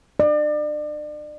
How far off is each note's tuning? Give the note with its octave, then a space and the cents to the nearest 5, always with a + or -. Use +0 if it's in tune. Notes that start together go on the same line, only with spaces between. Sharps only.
D5 +35